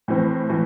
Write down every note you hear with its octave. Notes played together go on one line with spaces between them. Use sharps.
A2 E3 C4
A2 E3